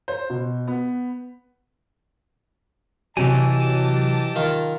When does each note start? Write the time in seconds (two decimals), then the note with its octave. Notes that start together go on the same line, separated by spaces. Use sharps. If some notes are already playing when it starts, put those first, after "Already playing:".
0.08 C5
0.30 B2
0.68 B3
3.17 C3 E3 F#3 G4 D#5 G#5 A5
4.35 D#3 F4